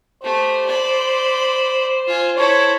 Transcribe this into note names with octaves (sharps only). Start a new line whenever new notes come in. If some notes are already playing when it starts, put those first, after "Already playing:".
A3 G4 C5
D5 B5
F4 G#5
E4 A4 C#5